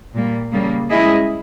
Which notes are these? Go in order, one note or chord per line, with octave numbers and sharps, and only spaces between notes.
A#2 G3 A#3
C#3 G3 A#3
G#3 C#4 E4 G#4 D#5